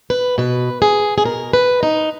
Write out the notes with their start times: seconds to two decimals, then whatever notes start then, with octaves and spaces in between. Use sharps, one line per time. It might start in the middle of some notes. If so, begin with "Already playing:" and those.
0.10 B4
0.38 B2 B4
0.82 G#4
1.18 G#4
1.25 B2 A#4
1.53 B4
1.83 D#4